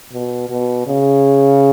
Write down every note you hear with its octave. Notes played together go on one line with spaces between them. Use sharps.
B2
B2
C#3